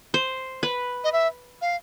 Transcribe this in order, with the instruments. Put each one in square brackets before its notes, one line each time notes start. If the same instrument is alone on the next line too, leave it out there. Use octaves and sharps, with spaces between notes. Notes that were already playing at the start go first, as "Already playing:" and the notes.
[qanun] C5
B4
[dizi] D#5
E5
F5